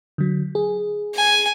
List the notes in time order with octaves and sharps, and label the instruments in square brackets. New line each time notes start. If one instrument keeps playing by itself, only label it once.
[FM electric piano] D3 F#3
G#4
[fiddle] G#5